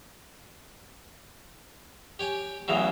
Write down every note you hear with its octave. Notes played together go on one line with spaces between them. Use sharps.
G4 C#5 G5 G#5
A1 E2 C#3 E3 F#3